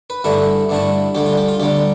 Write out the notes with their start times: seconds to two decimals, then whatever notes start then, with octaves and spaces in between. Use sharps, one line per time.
0.10 B4
0.24 G2 D3 A3 E4
0.69 G2 D3 A3 E4
1.15 D2 D3 G3 G4
1.26 F4
1.37 G4
1.49 F4
1.60 D2 D3 G3 G4